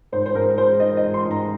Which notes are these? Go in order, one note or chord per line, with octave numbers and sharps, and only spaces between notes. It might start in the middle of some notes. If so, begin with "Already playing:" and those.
G#2 C5
C5
G#2 A#4
G#3 C5
D#4 D#5
D#5
G#2
C6
G#2
A#5